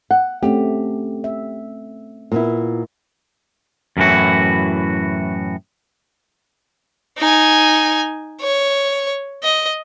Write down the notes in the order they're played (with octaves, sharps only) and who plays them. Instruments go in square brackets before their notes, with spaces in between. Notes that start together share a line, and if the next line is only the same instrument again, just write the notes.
[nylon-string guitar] F#5
[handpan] A3 C4 C#4 [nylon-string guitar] G4
[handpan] E5
[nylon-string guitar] A#2 B3 E4
[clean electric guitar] F#2 A2 E3 F#4
[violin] D#4 G#5
C#5
D#5